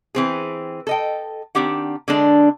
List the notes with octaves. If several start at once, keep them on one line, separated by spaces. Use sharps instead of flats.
E3 C4 G#4
A4 D#5 G5
D#3 C4 D4 G4 F#5
D3 G#3 D4